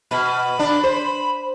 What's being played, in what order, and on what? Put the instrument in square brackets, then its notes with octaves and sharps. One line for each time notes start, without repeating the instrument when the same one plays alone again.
[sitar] B2 [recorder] B5
[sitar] D4
C5